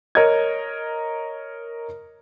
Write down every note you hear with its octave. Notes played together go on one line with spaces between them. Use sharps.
A#4 C#5 D#5 G#6